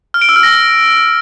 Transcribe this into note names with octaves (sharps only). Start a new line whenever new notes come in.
F6
D7
E6
F6
A#6